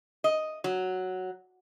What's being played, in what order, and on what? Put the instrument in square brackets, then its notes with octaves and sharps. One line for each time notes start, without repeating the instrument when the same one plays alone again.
[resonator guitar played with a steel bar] D#5
F#3